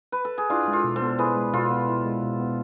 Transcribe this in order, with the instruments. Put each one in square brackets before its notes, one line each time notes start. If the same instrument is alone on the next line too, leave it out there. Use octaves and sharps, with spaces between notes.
[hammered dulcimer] B4
A4
G#4
[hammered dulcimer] D4 F4 [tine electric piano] E4
[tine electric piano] G#3
[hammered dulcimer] F4 A4
[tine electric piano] B2
[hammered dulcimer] A4 C5
[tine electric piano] B3
[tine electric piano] E4 [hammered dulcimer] G#4 B4
[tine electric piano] G#3
[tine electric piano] B2 [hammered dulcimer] F4 A4
[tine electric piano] B3
E4
G#3
B2
B3